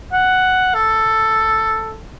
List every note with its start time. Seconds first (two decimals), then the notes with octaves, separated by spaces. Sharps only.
0.12 F#5
0.75 A4